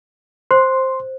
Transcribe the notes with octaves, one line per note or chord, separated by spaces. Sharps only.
C5 C6